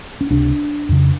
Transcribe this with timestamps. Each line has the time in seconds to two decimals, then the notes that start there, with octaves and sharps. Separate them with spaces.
0.21 C#4
0.30 C#2 C3 D4
0.89 F2 C#3